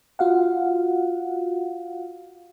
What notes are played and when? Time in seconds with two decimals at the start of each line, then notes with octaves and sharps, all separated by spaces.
0.19 F4 F#4 F5 F#5